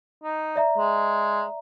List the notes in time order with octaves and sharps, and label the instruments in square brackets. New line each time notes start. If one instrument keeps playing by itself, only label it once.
[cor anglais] D#4
[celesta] D5 E5 A#5
[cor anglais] G#3